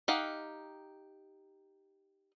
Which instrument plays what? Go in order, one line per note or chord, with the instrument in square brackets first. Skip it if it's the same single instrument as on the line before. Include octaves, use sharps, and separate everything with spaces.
[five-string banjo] D#4 G4 F5 F#5